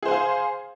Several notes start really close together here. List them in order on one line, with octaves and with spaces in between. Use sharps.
G#4 C5 G#5 F5